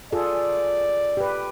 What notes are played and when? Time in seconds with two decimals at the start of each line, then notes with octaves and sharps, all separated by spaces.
0.12 F4 G#4 A4 D5
1.17 G4 B4